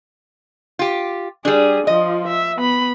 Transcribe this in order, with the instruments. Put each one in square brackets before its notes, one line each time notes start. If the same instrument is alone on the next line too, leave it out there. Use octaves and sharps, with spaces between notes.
[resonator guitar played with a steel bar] F4 G4
[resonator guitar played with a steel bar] G3 D4 [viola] G#4
[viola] F3 F4 [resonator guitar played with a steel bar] D#5
[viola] E5
B3 B5